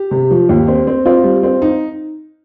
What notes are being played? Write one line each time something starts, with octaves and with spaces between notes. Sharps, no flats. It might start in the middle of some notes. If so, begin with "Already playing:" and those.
Already playing: G4
C3
F3
D#2
C4
C4
C4 F4
G3
C4
D#4